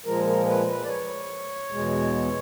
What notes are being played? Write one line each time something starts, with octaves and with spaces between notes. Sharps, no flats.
A#2 F3 G#3 A#4
A#4
B4
B4
D5
C#5
E2 B2 G#3